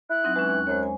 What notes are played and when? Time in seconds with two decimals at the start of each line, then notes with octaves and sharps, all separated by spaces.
0.10 E4 F#6
0.24 F#3 C4 D#4
0.36 E3 G#3 C#4
0.50 D#2 C#6
0.67 F#2 G#3 C5 C#5
0.83 G#5